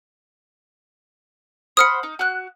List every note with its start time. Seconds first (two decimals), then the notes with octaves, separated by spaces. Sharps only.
1.77 C5 F#5 B5 D#6 F6 C#7
2.03 D#4
2.19 F#4 F#6